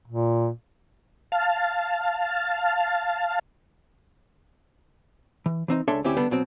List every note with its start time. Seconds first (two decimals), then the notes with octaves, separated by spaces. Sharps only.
0.08 A#2
1.32 F5 A5
5.46 E3
5.68 E3 C4 D#4
5.88 C#2 D4 A4 C#5 E5 C6
6.04 D2 C4 C#4 E4 G4
6.17 D3 G3 B3 D4
6.31 B2 F#3 C4